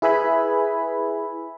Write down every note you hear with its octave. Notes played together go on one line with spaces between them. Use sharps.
E4 G#4 B4 E5 G#5 B5